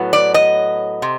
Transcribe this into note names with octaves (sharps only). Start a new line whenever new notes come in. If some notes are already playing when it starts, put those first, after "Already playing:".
Already playing: A2 F#3 B3
D5
D#5
C3